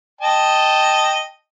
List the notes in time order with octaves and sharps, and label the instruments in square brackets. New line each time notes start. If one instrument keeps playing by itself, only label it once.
[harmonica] D#5 G5 A5